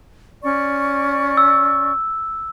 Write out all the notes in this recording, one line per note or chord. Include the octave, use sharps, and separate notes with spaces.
C#4 D5 C#6
E6